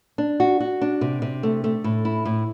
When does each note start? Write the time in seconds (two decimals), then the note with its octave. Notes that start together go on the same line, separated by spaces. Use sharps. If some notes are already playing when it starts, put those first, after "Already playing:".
0.18 D4
0.40 F#4
0.60 F#4
0.81 D4
1.01 C3
1.22 C3
1.43 A3
1.64 A3
1.84 A2
2.05 E4
2.25 A2